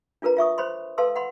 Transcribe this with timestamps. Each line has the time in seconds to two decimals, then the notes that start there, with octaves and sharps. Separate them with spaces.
0.22 D4 F4 A#4 B4 A#5
0.37 F4 E5 C#6 D#6
0.58 C5 C#5 B5 C6
0.98 A4 B4 F5 A5 C6 E6
1.16 F#5 B5 C6